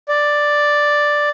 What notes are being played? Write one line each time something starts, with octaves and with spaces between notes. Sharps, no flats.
D5